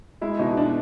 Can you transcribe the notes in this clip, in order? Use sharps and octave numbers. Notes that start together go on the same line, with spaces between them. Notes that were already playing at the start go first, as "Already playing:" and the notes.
G#3 E4
B2 D#4
B3 D4